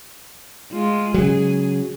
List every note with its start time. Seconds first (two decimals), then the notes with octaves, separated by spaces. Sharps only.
0.72 G#3 F4
1.14 C#3 F#3 G#4